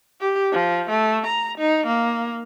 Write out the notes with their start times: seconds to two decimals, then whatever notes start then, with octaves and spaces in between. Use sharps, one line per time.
0.21 G4
0.52 F3
0.89 A3
1.26 A#5
1.58 D#4
1.87 A#3